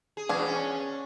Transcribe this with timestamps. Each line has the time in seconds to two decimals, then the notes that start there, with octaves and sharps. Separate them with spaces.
0.17 G#4
0.29 E2 B2 D4 G#4 G#5
0.45 C#4